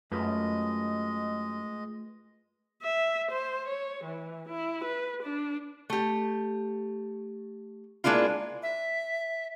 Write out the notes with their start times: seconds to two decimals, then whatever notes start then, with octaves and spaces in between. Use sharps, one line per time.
0.12 F#2 G#3 A3 F4 B4 D#5
2.83 E5
3.31 C5
3.68 C#5
4.04 E3
4.50 E4
4.85 B4
5.23 D4
5.90 A3 G4
8.04 G#3 A#3 D4 E4 F4
8.63 E5